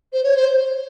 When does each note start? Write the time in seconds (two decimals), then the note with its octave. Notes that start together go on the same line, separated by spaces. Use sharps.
0.13 C5
0.24 C#5
0.35 C5